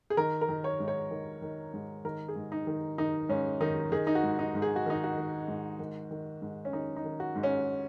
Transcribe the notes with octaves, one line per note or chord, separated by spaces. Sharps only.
G#4
D#3 A#4
A#4
D#3
C#5
G#2
C#5
D#3
D#3
G#2
D#3 A#4
G#4
G#2
D#4
D#3
D#3 D#4
G#2 C#4
D#3 D#4
D#3 G#4
D#4
F#4
G#2
D#4
G#2
G#4
F#4
D#3 D#4
F#4
D#3
G#2
D#3
D#3
G#2
C#4
D#3 D#4
D#4
D#3
F#4
G#2
C#4